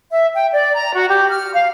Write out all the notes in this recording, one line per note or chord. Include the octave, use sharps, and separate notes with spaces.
E5
G5
D5
A#5
F#4
G4
F6
F5